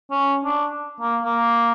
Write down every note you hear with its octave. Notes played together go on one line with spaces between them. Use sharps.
C#4
D4
A#3
A#3